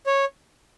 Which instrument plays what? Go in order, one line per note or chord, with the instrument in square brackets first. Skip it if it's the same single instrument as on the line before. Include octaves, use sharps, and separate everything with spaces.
[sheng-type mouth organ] C#5